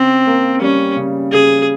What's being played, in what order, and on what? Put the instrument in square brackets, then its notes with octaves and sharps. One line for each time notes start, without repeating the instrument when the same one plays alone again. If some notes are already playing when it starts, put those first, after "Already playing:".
Already playing: [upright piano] C#3 [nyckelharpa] C4
[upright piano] A#3
[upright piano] G3 [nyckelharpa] C#4
[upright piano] C#3
[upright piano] C#3 [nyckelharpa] G#4